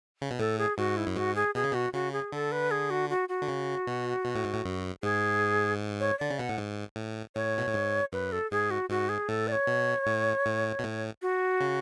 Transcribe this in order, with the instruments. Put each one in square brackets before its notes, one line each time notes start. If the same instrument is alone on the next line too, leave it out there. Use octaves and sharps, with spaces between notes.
[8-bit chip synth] C#3
B2
[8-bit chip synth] A2 [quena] A4
[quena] G#4
[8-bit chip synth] G#2 [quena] F#4
[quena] E4
[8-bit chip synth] F#2
[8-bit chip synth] G#2 [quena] F#4
[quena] G#4
[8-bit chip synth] B2 [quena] G#4
[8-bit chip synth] C#3
[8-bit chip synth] B2 [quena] F#4
[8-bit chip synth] C#3 [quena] F#4
[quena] G#4
[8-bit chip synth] D3 [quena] A4
[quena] B4
G#4
F#4
F#4
F#4
[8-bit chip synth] D3
C#3
B2
B2
A2
G#2
A2
F#2
[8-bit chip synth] G#2 [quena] G#4
[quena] C#5
[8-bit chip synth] D3 [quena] D5
[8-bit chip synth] C#3
[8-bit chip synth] B2 [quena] F#5
[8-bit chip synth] A2
G#2
A2
[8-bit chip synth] A2 [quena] C#5
[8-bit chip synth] B2
A2
G#2
[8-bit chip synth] F#2 [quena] B4
[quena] A4
[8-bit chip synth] G#2 [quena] G#4
[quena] F#4
[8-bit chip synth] G#2 [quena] F#4
[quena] G#4
[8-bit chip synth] A2 [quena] A4
[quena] D5
C#5
[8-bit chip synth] B2
A2
A2
B2
A2
[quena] F#4
[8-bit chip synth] C#3